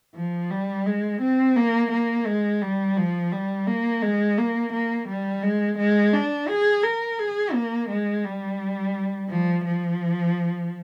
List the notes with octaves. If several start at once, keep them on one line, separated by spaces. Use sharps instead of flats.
F3
G3
G#3
C4
A#3
A#3
G#3
G3
F3
G3
A#3
G#3
A#3
A#3
G3
G#3
G#3
D4
G#4
A#4
G#4
A#3
G#3
G3
F3
F3